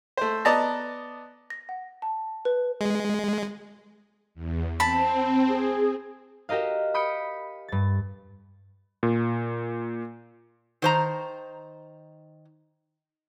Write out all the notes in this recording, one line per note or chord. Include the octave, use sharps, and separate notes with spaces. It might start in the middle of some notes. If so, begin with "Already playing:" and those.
A3 C5
B3 D5 D#5 A5 A#5
A#6
F#5
A5
B4
G#3
E2
C4 A5 B5
G#4
F#4 G4 A#4 D#5 F5
B5 D#6 G6 C#7 D7
G2 A6
A#2
D#3 C5 A#5